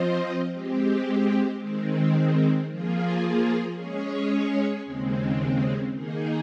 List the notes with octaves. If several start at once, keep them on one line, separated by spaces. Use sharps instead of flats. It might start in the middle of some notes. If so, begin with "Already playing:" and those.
Already playing: F3 C4 F4 C5 D#5
G#3 C4 G4
D#3 G#3 C4
F3 A#3 F4 G#4
G#3 C#4 G#4 C#5
D#2 C#3 G#3 C4
D#3 A#3 D#4 G#4